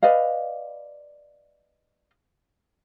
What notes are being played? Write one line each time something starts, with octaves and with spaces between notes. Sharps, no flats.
B4 D5 D#5 F5